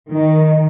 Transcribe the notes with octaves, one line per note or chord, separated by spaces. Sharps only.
D#3